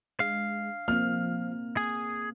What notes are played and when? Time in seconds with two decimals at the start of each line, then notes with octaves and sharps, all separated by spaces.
0.20 G#3 D4 F5
0.88 F3 A#3 C4 F6
1.77 G#4 D#6